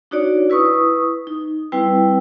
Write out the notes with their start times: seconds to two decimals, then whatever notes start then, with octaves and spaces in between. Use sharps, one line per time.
0.11 D4 D#4 F#4 C#5 D5
0.50 E4 B4 C#6 D#6
1.27 D#4
1.72 G3 C4 E4 B4 G5